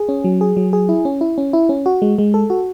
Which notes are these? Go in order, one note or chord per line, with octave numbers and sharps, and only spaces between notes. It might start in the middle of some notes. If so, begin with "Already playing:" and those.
Already playing: G#4
C#4
F#3
G#4
F#3
G#4
E4
C#4
E4
C#4
E4
C#4
F#4
G#3
G#3
A4
F#4